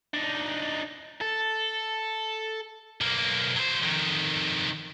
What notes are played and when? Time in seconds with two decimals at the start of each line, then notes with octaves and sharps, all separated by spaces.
0.14 D4 D#4
1.21 A4
3.01 B1 A#3
3.56 F#3 C5
3.83 F2 D#3